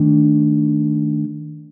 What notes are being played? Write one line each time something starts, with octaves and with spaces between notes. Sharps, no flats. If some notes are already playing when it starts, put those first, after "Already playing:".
Already playing: D#3 A3 D4